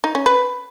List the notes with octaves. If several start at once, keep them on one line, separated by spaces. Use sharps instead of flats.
D#4
C#4
B4